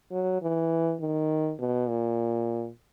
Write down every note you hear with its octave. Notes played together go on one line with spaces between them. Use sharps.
F#3
E3
D#3
B2
A#2